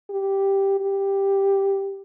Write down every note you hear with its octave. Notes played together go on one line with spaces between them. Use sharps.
G4
G4